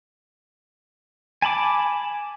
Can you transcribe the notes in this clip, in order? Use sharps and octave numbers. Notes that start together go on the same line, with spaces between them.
G#5 A5 B5 D6